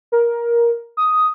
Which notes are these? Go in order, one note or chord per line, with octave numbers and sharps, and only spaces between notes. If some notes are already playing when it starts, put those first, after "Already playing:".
A#4
D#6